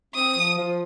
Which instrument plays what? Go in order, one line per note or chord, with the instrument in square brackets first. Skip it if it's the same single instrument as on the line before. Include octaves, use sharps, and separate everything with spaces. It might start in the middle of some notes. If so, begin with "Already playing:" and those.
[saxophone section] C4 [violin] D#6
[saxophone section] F3
F3